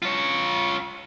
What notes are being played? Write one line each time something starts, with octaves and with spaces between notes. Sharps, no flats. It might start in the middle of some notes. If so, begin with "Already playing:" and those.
F4 C#5